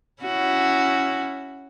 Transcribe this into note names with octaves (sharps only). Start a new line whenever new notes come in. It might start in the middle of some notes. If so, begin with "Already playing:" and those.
C#4 E4 F#4